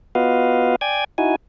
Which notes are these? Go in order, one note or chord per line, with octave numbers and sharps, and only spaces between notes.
B3 F4 F#4 B4 D#5 F5
D5 G5 G#5 G#6
D#4 E4 F#4 G#5